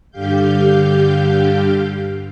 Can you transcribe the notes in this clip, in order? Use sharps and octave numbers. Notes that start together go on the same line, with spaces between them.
G2 D3 G4 F5 G6